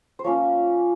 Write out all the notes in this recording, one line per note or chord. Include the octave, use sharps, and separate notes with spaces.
C5
F3 A#3 C#4 C#5